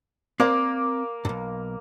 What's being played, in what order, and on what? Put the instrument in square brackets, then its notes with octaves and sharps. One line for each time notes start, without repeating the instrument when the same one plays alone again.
[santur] A#3 [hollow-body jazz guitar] C4 D5
[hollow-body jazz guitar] B1 G2